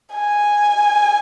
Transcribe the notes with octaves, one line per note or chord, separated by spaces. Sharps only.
G#5